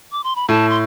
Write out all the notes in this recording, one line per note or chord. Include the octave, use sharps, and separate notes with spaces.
D6
C6
B5
A2 A5
C6